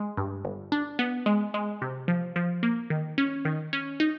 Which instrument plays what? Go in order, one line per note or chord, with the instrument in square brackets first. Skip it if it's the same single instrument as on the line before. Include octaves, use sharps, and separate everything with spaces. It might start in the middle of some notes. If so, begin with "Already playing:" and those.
Already playing: [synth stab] G#3
G2
G1
D4
B3
G#3
G#3
C3
F3
F3
A#3
D#3
C#4
D#3
C#4
D#4